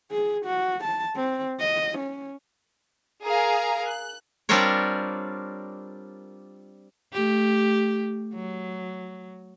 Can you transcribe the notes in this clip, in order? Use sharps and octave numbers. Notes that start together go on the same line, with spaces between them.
G#4
F#4
A5
C4
D#5
C#4
G#4 A#4 F5 A#5
F#6
G3 C4 D4 F4 A#4 C#5
A3 G4
F#3